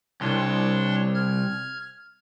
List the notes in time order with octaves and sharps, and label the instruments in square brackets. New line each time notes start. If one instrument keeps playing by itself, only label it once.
[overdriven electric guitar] C2 [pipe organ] D4 C#5 C6
[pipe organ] F6 G#6